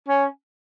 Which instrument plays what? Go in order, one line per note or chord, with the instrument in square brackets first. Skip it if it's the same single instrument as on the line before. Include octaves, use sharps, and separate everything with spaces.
[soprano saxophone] C#4